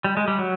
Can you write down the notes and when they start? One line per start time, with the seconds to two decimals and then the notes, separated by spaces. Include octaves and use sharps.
0.04 G3
0.17 G#3
0.28 G3
0.39 F#3